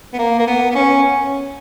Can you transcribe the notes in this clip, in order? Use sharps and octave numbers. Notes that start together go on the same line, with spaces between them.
B3
A#3
A#3
B3
B3
C#4